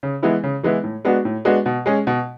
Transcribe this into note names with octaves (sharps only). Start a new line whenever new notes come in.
C#3
E3 G#3 B3 E4
C#3
E3 G#3 B3 E4
A2
G#3 B3 D4 F#4
A2
G#3 B3 D4 F#4
B2
G#3 C#4 G#4
B2